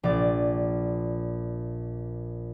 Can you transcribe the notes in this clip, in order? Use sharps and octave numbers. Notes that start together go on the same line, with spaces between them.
A#1 D5